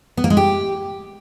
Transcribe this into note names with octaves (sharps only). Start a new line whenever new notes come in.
B3
A#3
G#3
G4